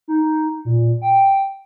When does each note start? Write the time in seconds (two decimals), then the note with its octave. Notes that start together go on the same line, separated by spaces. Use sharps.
0.08 D#4
0.65 A#2
1.02 G5